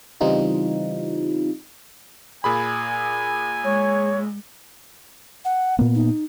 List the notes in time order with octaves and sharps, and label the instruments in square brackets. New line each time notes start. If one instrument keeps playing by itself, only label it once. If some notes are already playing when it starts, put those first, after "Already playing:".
[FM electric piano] C#3 E3 G3 C4 D#4 F4
[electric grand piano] A#2 G#4 B5 [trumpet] G#5
[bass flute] G#3 [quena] C#5
[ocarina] F#5
[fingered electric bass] A#2 A#3 B3
[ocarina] D#4